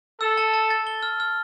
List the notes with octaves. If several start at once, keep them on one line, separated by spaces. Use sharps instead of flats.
A4 E6
A5
A5
A6
G7
F6
F6